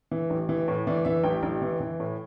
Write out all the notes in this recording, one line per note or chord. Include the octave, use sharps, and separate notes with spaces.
E3
A1
E3
A2
E3 D5
E3 E5
A1 G5
A1 G5
E3
E3
A2